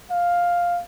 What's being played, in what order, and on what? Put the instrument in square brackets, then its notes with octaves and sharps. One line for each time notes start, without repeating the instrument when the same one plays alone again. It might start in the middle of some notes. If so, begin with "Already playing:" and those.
[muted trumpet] F5